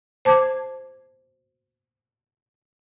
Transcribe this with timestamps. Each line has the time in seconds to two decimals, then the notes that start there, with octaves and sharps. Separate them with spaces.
0.25 C5 A5 D6 G#6